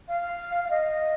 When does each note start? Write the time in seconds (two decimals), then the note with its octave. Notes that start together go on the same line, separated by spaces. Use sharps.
0.08 F5
0.64 F5
0.70 D#5